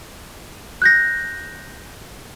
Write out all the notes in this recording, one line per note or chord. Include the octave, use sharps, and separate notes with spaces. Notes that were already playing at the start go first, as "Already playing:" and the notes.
F#6 G6 A#6